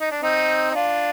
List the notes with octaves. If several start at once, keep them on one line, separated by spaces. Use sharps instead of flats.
D#4
D4
C4 D#4
D#4
D4 F4